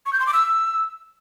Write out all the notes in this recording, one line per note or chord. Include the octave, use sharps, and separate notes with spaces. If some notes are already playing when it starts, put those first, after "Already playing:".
C#6
G6
C6
D6
E6